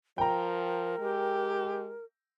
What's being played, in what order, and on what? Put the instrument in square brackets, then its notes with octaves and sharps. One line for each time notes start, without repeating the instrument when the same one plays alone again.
[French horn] F3 [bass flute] A#4 [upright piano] G5 A#5
[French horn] G#3 [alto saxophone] G4